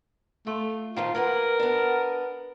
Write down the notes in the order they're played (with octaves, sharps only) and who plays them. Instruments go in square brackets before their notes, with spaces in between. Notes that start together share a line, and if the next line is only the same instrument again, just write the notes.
[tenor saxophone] A3 [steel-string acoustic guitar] F4
[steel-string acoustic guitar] D#3 F3 A3 [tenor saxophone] F4
[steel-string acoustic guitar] A#3 B4 F#5 [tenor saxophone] A#4
[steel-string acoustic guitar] B3 D4